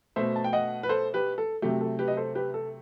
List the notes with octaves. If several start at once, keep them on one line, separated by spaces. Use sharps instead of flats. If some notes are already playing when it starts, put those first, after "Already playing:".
B2 A3 C5 E5
A5
G5
D#5 F#5
B4
A4 C5
G4 B4
A4
C3 F#3 A3 G4
A4
G4 B4
D#5
A4 C5
G4 B4
A4